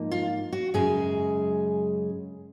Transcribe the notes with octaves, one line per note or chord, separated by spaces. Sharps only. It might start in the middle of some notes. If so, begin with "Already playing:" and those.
Already playing: G#2 F3 A#3 D#4
F4
F#4
F#2 C#3 G#3 G#4